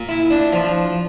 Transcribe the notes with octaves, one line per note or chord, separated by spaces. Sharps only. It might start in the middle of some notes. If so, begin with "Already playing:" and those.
Already playing: A#2
E4
D4
F3